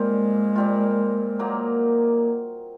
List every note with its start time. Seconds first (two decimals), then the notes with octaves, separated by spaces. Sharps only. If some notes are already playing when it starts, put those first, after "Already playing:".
Already playing: A#2 G3 G#3 C4 F4
0.56 A#2 G3 C4 F4
1.39 A#2 F#3 A#3 D#4